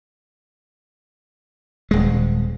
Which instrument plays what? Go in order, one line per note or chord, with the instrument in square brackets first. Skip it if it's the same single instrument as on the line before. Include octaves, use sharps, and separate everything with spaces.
[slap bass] D#1 G#3